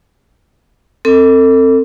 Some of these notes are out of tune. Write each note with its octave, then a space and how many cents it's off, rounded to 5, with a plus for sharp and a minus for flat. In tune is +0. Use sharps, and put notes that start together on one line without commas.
C4 +15 A4 +30